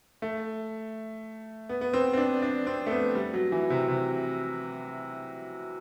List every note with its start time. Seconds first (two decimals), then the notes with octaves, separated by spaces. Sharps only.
0.22 A3
1.69 B3
1.81 B3
1.94 C4
2.13 C4
2.17 D4
2.42 D4
2.67 C4
2.86 A3
2.91 B3
3.15 G3
3.34 F#3
3.52 E3
3.70 C3
3.88 C3